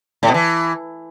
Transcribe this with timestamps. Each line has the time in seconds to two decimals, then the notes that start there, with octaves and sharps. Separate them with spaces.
0.23 A2
0.28 B2
0.34 E3